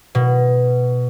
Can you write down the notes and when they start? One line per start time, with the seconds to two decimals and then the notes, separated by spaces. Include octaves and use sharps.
0.15 B2